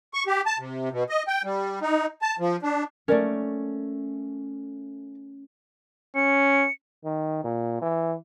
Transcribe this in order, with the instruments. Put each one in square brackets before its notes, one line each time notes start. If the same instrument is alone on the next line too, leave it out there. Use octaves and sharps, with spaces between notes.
[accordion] C#6
G4
A5
C3
B2
D#5
G5
G3
D#4
A5
F3
D4
[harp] A3 C#4 [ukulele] A#4 D5
[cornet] C#4 [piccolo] C#7
[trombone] D#3
A#2
E3